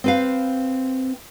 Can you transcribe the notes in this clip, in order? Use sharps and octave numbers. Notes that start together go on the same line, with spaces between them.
C4 B4 F5